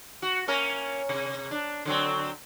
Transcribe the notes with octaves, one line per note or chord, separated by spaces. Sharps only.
F#4
A#3 C#4 A#4
C3
D4
D3 F#3 C4